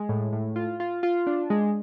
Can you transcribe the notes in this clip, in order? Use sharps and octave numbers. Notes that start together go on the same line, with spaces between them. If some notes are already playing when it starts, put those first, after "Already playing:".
Already playing: G#3
A2
A2
F4
F4
F4
D4
G#3